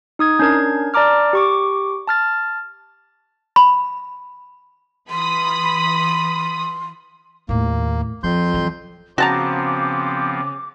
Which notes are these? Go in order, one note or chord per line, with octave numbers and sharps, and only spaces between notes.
D#4 D#6 G#6
C#4 D4 A#4 G#6
D5 A5 A#5 D6 F6
G4 C#6 D6
A5 F6 A6
B5
E3 B5 C6 D#6
D#2 A2 A3 A#3
F2 F3 F4 C6 G6
E3 F#3
C#3 F3 B3 C4 F#4 A5 A#5 D6